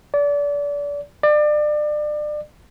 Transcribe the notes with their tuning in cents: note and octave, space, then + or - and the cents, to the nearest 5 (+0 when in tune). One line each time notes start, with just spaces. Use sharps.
D5 -30
D5 +30